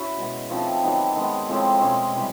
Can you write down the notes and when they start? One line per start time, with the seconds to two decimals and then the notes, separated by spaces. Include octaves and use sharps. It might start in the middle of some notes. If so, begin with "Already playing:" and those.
Already playing: C#4 E4 F#4
0.17 B2 G#3 B3
0.50 F3 A3 C4 D#4
0.84 D#3 F#3 B3 D#4
1.16 D#3 G#3 B3
1.48 A2 F3 G#3 C4
1.81 B2 G#3 C#4
2.13 C3 E3 G3